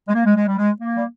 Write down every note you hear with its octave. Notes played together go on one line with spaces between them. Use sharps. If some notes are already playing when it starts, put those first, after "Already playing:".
G#3
A#3
G#3
G#3
G3
G#3
A#3
G3